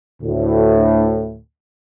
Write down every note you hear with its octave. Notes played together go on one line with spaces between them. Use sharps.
D2 A2